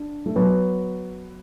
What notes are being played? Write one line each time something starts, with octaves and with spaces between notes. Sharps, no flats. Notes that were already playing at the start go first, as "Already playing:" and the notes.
Already playing: D4
A3
F#3 B3